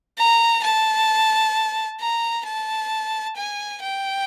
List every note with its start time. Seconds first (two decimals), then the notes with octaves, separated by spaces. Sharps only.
0.18 A#5
0.63 A5
2.00 A#5
2.45 A5
3.36 G#5
3.82 G5